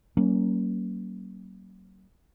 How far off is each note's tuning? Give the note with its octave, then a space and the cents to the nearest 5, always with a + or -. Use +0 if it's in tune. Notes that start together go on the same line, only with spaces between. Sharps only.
F#3 +45 A#3 +0 C#4 +0